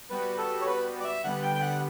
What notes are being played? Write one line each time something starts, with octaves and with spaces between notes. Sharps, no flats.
G3 B3 F#4 B4
A4
C#5
B4
D5
E5
D3 G3 B3 F#5
G5
G5
F#5